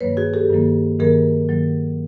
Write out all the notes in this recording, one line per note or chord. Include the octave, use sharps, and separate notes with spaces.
G2 D#3 F#3 A#3 B4 C#5
F#4 G#4
G4 A4
G2 D#3 F#3 A#3
G2 D#3 F#3 A#3 G#4 A#4
G2 D#3 F#3 A#3